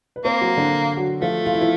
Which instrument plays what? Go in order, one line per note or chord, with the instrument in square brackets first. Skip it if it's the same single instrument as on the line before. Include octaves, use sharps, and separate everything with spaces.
[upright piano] B4
[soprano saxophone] A#3 [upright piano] C4 C5
[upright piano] F#3 F#4
D3 D4
F#3 F#4
[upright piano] F3 F4 [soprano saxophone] A3
[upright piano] F4
E4
F3 F4